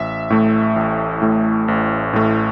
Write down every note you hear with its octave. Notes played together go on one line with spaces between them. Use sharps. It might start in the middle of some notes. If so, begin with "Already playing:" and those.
Already playing: A1 E5
A2 A3
A1
A2 A3
A1
A2 A3